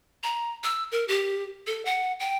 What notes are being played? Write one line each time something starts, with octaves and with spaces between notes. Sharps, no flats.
A#5
E6
A#4
G4
A4
F#5
G5